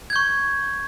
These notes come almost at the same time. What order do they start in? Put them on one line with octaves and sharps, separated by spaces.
G#6 G6 C#6